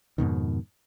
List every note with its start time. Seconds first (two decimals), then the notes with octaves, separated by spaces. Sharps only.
0.18 F2 G#2 B2 D#3